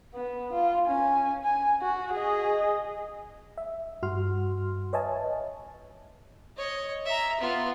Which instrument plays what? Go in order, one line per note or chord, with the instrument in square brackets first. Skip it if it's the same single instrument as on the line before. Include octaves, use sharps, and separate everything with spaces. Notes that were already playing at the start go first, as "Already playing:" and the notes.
[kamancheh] B3
F4
C#4 G#5
G#5
F#4
G#4 D#5
[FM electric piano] E5
G2 F#4 C6 F6
B4 C#5 D#5 E5 G#5 A5
[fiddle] C#5 D#5
E5 A#5
B3 F4